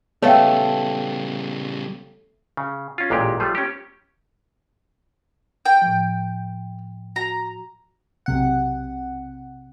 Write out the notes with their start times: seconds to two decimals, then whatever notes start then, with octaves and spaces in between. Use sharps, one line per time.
0.22 C#3 G3 A3 B3 A4 C#5 F5 G5
2.57 C#3
2.98 C#4 F4
3.10 A1 A#2 G#3 G4
3.40 F3 G3 A3 F4
3.55 C#4 G4
5.66 G5
5.82 A2 F3
7.16 F#4 A#5
8.26 B1 C3 F#5